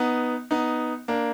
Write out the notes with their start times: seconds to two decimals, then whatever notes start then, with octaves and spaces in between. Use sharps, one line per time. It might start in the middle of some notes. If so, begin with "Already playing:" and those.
Already playing: B3 D#4
0.51 B3 D#4
1.08 A#3 D4